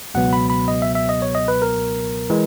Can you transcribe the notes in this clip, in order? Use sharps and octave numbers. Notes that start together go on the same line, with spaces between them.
C#2 B2 F#3 B3 F#5
B5
B5
D#5
E5
E5
D#5
C#5
D#5
B4
A#4
E3 G#3